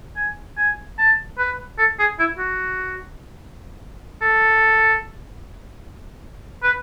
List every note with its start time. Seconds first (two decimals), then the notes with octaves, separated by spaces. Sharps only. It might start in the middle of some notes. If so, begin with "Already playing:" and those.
0.17 G#5
0.57 G#5
0.98 A5
1.39 B4
1.78 A4
1.99 G#4
2.19 E4
2.39 F#4
4.22 A4
6.63 B4